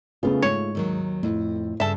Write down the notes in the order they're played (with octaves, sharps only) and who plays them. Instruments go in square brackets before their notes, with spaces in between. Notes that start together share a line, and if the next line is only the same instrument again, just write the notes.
[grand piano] C#3 B3 C#4 [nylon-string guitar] A3 F4
[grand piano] G#2 [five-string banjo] C#5
[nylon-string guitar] D#2 D#3 F#3
[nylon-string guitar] F2 [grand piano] A2
[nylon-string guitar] G2 C#3 [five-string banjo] A4 E5